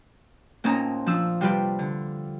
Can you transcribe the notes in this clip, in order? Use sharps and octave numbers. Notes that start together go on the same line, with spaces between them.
A#2 C4 C#4 D#4 A5 A#5
F3 D4 E6
C3 G3 F4 B4 D5
D3